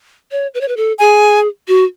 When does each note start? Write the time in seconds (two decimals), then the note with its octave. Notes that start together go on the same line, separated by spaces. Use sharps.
0.31 C#5
0.54 B4
0.61 C#5
0.68 B4
0.77 A4
0.99 G#4 G#5
1.68 F#4